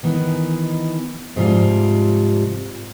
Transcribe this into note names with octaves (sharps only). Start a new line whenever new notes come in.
D#3 E3 B3 D#4
G#2 C3 F3 G3 F4